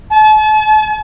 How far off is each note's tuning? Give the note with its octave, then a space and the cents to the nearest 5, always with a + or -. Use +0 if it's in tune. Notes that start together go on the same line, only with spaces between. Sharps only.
A5 -40